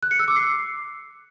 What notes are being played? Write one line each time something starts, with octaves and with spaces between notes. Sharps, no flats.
F#6
C#7
E6
D6
C7